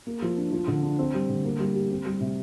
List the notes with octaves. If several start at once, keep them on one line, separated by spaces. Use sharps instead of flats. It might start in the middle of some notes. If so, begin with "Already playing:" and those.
A#3
F3
D4
F3
D3
D4
C4
G3
D3
A#3
G3
G4
C4
G3
C3